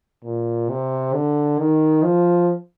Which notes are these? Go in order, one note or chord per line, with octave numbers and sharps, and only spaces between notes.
A#2
C3
D3
D#3
F3